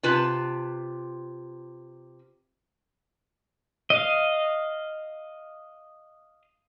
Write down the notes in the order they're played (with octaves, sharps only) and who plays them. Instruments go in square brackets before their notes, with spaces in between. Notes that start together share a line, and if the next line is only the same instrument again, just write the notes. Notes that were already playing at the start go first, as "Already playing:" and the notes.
[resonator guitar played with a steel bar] C3 F4 B4 A5
[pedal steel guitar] D#5 F5